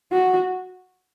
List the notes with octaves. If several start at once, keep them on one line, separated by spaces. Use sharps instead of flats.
F#4